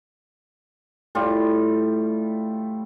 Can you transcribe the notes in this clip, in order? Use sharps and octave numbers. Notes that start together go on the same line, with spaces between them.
A2 G3 F4